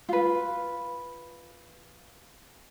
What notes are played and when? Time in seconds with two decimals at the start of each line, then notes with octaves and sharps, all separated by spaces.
0.09 F4 B4